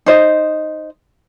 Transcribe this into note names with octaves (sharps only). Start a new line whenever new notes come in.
D#4 C5 D#5